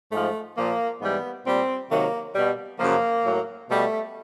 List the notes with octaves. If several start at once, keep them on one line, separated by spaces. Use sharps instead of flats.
G#2 F3 A3
A#2 F3 A#3
G#2 E3 G3 B3
A#2 G3 C4
C3 D#3 F#3 A#3
B2 G3
F#2 C#3 F3 A#3
A2 F#3
B2 G3 A3